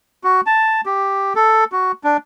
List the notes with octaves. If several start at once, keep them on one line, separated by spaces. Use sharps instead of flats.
F#4
A5
G4
A4
F#4
D4